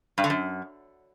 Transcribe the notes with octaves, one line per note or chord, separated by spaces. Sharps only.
G2
D3
F#2